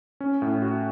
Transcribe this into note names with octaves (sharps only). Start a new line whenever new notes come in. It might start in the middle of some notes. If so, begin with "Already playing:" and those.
C#4
A2
F#4